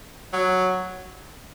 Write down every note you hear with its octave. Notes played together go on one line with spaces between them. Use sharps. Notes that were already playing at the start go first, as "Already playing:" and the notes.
F#3